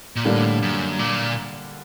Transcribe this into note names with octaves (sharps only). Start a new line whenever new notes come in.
A#2
A2 D3 G3 A#3 D4
F#2
A#2